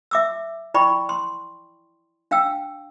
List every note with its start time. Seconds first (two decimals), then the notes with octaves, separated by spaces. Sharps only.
0.11 E5 D6 E6
0.74 E4 D5 G5 B5 C#6
1.09 C6
2.31 D4 F5 G5 E6